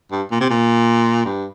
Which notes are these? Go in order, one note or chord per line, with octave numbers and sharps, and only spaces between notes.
G2
A#2
C3
A#2
G2